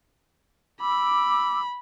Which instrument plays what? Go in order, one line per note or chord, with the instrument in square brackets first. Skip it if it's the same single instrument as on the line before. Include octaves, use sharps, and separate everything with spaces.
[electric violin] B5 [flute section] D6 E6